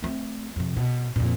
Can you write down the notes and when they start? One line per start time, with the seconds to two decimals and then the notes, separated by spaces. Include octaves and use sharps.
0.02 A3 C4
0.56 F2 C3
0.77 B2
1.16 F2 A#2